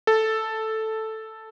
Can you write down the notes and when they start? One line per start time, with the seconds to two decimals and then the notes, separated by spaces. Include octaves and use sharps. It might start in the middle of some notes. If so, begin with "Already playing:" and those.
0.07 A4